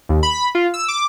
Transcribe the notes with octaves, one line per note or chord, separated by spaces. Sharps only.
D#2
B5
F4
E6
D6